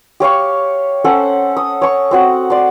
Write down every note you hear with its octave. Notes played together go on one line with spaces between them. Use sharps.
G4 C#5 F5 C#6
C#4 A4 C5 F#5
D#6
C#5 C#6
C4 F#4 F#5
D5 C6